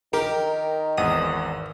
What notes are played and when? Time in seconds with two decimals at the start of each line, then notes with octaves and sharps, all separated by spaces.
0.13 D#3 G4 A#4
0.98 G#1 E2 F#5 D#6